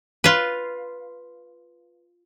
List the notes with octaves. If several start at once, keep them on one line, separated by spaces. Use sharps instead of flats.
F4 B4